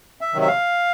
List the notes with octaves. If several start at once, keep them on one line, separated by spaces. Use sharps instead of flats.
E5
C3 D#3 F#3
E5
F5